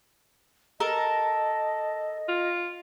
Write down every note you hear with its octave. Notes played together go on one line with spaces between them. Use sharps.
A4 A#4 D#5 A5
F4